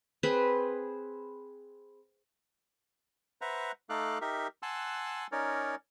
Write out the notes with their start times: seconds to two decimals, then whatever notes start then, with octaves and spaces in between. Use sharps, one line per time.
0.23 C4 G#4 B4
3.41 B4 C5 E5 F#5 A#5
3.90 A3 D#4 A4 F5 D6 F#6
4.21 D#4 G4 A#4 E5
4.63 F#5 G#5 A5 C6 E6 F#6
5.32 C#4 D#4 A#4 C#5 D5